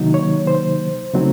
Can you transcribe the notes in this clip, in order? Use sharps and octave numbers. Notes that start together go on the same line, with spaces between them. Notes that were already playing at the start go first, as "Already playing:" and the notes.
Already playing: C3 D#3 F#3 A#3 D#4
C#5
C5
C#3 F#3 A3 C4 D#4